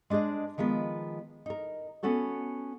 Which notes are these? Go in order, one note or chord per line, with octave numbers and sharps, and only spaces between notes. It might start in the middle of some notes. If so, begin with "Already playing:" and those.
G#3 D4 G#4 C5 D#5
D#3 F3 G#3 B3
D#4 A#4
B3 C#4 F#4 A4 C#5